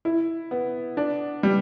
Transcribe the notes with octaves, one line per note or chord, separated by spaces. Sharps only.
E4
B3
D4
G3